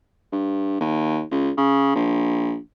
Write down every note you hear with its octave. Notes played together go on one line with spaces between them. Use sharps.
G2
D#2
C#2
C#3
A#1